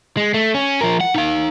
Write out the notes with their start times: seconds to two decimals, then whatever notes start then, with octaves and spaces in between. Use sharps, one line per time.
0.17 G#3
0.34 A3
0.54 C#4
0.81 F3 A#4
1.01 F#5
1.15 D#4 F5